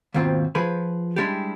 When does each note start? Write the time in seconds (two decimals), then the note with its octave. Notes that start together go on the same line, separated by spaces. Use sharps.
0.14 D#2 G#2 B2 C4 F4
0.55 F3 G#4 B4
1.16 G3 G#3 D4 E4 G4